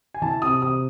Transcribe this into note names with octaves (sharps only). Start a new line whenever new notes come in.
G#5
E3 A5
C3 D#6
C3 D#6